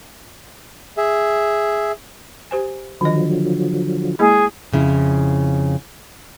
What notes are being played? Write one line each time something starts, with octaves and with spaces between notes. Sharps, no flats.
G#4 E5
G4 C5 G#5
D3 D#3 F3 F#3 D#5
G#3 A#3 E4 G#4
F2 C#3 E4